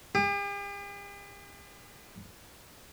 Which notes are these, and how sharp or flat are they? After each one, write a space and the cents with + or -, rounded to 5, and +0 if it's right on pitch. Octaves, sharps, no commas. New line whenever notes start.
G4 +45